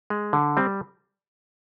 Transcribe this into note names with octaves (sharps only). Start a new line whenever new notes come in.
G#3
D3
G3 C4